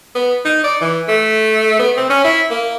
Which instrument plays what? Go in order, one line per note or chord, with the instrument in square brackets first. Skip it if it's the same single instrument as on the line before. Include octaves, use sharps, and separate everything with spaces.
[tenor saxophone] B3
D#4
D5
E3
A3
B3
C4
C#4
E4
A#3